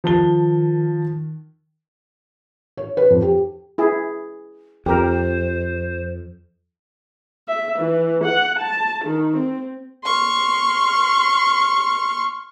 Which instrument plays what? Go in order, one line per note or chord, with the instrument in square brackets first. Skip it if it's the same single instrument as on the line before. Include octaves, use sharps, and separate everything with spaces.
[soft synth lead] D#3 [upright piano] F3 A5 G7
[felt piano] C#5
B4
F2
G4
[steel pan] E4 G#4
[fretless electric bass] F2 [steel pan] G4 A#4 [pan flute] C5
[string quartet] E5
E3
F#5
A5
D#3
C4
C6 C#6 F6